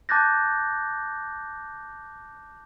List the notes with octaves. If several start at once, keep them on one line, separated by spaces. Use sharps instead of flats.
A5 D6 F#6 G6 A6 A#6